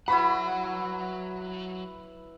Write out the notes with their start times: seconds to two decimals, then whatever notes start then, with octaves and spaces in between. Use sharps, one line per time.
0.08 F#3 E4 F#4 B4 F#5 B5